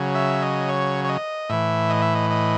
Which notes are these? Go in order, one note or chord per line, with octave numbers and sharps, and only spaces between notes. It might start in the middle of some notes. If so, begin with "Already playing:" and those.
Already playing: C#3 F#3
E5
D#5
C#5
C#5
D#5
A2 E3 E5
D#5
E5
D#5
D#5